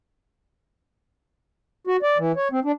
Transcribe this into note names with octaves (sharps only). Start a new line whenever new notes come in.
F#4
D5
E3
C#5
C4
D4